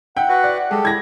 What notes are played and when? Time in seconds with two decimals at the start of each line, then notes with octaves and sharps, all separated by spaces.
0.17 E4 F#5 G5
0.29 F#4 B4
0.44 D5
0.71 G#3 G4 A4
0.85 E4 G#6 A#6